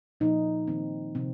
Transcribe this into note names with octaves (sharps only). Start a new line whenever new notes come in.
A#2 F3 A#3 D#4
D#3 A#3 C4
C3 F3 C4